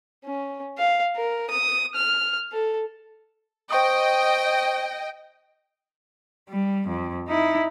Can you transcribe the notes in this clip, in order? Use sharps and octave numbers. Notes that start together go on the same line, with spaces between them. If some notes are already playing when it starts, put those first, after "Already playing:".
C#4
F5
A#4
D#6
F6
A4
C5 D#5 G5 C#6 D#6
G3
F2
D#4 E4